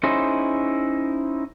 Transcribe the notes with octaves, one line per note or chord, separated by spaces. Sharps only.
C#4 D#4 E4 G#4 C5